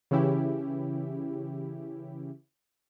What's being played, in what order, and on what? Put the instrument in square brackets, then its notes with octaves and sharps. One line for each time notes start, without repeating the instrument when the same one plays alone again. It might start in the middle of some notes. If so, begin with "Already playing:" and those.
[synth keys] C#3 E3 C#4 E4 G4